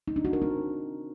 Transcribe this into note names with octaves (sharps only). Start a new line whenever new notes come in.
D#4
D4
F#4
A#4
C4